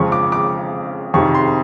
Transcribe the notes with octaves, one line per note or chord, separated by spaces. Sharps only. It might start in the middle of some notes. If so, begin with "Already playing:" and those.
Already playing: F2 C#3 F3 G#3 C#4 C#6
D6
D6
F2 C3 D#3 C#6
C6